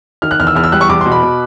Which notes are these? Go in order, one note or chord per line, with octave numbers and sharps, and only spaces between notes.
D#3 F6
F#6
E2 F6
E6
E2 F6
E6
G3 F#6
C#6
E2 D6
C6
B2
B5
B2